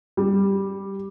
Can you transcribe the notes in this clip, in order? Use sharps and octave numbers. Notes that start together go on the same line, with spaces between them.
G3